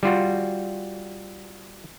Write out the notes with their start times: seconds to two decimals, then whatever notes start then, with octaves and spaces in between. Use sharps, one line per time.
0.03 G3 F4 F#4